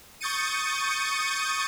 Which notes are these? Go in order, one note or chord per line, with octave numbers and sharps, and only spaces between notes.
C#6 D#6 G6 A6 C#7 D#7